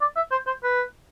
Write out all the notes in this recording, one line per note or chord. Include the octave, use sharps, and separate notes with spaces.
D5
E5
C5
C5
B4